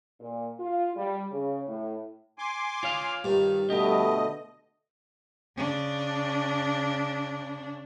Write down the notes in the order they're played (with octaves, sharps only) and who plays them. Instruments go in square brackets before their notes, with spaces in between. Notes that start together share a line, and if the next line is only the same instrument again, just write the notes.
[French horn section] A#2
F4
G3
C#3
A2
[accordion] G#5 C6 D6
[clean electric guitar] F4 C#5 F5
[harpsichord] G2 [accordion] D#3
[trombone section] B2 D3 A3 [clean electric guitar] G4 [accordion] D#5
[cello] C#3 D4